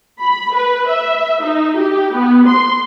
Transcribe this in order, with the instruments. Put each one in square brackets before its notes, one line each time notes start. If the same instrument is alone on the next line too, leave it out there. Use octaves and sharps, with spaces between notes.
[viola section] B5
B4
E5
D#4
G4
B3
C6